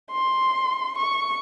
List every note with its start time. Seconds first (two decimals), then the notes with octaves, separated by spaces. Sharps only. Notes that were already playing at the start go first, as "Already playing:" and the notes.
0.11 C6
0.98 C#6